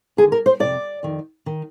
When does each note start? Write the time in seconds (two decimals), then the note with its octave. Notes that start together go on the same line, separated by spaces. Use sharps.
0.17 D#2 D3 G#4
0.32 A#4
0.46 C5
0.60 F2 C3 D#3 D5
1.03 F2 D#3
1.46 D#3